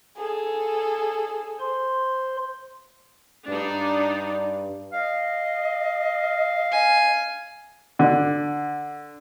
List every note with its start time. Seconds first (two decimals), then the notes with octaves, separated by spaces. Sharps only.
0.17 G#4 A4
1.60 C5 C6
3.50 G2 D4 D#4 D5
4.93 D#5 F5
6.71 G#5
7.99 D3